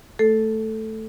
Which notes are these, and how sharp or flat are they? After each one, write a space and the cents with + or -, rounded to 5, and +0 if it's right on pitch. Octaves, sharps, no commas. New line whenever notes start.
A3 +0 A4 +0